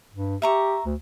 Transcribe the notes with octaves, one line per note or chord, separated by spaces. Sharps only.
G2
G4 E5 A#5 C#6
D2